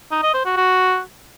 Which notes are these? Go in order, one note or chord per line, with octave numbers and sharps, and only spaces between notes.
D#4
D#5
C5
F#4
F#4